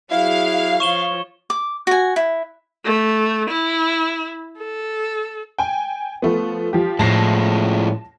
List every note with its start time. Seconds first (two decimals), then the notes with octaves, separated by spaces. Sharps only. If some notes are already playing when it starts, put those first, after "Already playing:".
0.12 F#3 E4 G#4 F5
0.80 F3 C#5 C#6 E7 G7
1.50 D6
1.87 F#4 G#5
2.16 E4
2.85 A3
3.50 E4
4.57 A4
5.58 G5 G#5
6.22 F3 A3 B3
6.73 F3 G4
6.99 A2 F3 G#3 A5 A#6 C7